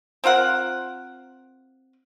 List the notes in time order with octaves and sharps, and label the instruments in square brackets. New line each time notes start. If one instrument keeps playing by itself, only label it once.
[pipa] C4 F4 A#4 F#5